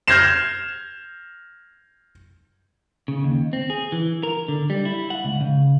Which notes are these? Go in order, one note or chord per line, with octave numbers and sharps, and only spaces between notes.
F6 G6 G#6 A#6 C7 E7
C#3
D#2
C4
G#4
E3
A#4
D3
G3
E4
F#5
C#2
C#3